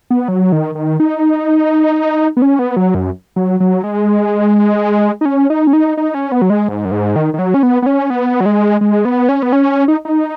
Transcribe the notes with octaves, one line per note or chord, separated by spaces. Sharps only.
B3
F#3
D#3
D#3
D#4
B3
C#4
B3
F#3
F#2
F#3
F#3
G#3
D#4
C#4
D#4
C#4
D#4
D#4
C#4
B3
F#3
G#3
G#2
F#2
G#2
D#3
D#3
F#3
C#4
B3
B3
C#4
B3
F#3
G#3
G#3
B3
C#4
B3
C#4
D#4
D#4